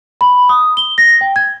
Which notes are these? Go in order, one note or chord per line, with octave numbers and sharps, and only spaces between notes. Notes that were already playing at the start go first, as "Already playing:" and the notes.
B5
D#6
G7
A#6
G5
G#6